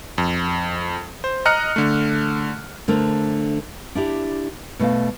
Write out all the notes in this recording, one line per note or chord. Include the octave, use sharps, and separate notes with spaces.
F2
C5
D#5 A#5 F6 F#6 C#7
D3 A3
D3 A3 D4 A#4 C5
D4 E4 G4
B2 A3 D5 F5